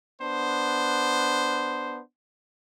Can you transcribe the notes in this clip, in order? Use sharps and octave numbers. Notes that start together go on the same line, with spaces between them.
B3 D4 C5